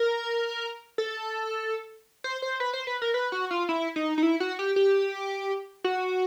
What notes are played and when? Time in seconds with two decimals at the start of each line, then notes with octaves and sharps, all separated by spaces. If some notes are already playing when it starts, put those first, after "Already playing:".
Already playing: A#4
0.98 A4
2.24 C5
2.42 C5
2.60 B4
2.73 C5
2.87 B4
3.02 A#4
3.14 B4
3.32 F#4
3.51 F4
3.69 E4
3.96 D#4
4.18 D#4
4.23 E4
4.40 F#4
4.59 G4
4.76 G4
5.84 F#4